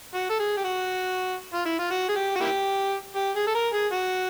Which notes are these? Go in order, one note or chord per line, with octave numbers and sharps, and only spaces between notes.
F#4
A4
G#4
G4
F#4
F4
E4
F4
F#4
G#4
G4
F#4
A#3 E4 G4
G4
G#4
A4
A#4
G#4
F#4